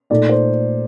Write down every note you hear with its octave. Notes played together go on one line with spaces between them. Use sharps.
A#2 A3 D#4 D5
C5